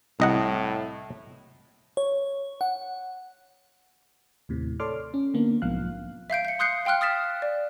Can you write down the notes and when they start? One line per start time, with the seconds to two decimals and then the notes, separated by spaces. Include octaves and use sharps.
0.20 C2 A2 D#5 F#5
1.97 C#5
2.61 F#5
4.49 D#2 A2 C3
4.80 A4 C#5 D5 C6 D6 F6
5.14 C#4
5.34 D3 A#3 B3 D4
5.62 B1 G#2 F3 F5 F#6
6.30 E5 F5 G6 D7
6.45 G6 C#7
6.59 C6 D#6 F#6 G6 C7 C#7
6.85 F5 G5 C6 F6 F#6
7.01 D#6 F6 A6 B6 E7
7.42 D5